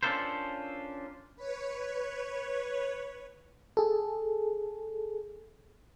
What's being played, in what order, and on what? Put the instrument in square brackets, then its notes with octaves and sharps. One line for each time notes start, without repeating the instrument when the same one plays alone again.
[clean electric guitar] C#4 D4 F4 A4 A#4 C5
[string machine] B4 C#5
[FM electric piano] G#4 A4